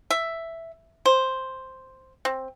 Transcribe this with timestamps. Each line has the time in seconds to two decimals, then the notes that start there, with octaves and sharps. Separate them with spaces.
0.10 E5
1.06 C5
2.25 C4